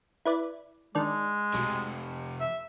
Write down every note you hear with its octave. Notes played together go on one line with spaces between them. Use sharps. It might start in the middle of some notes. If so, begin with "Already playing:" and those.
E4 B4 D5
D#3 G#3 D4 D5
B1 F2 C3
E5